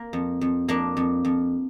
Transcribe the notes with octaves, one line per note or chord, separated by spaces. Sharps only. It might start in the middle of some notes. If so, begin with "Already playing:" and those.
Already playing: A#3
F2
F2
F2 A#3 D4
F2
F2